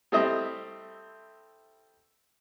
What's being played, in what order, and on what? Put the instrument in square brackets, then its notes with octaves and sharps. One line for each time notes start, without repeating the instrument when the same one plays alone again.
[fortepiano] G3 A3 C4 E4 D#5 E5